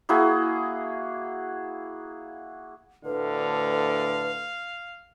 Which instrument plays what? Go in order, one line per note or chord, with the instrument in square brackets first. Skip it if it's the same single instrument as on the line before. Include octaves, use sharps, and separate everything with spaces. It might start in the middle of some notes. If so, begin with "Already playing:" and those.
[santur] A#3 E4 F#4 G#4
[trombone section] D2 A2 D3 [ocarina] B4 [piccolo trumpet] F5